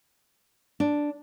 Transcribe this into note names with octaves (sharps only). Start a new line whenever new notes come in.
D4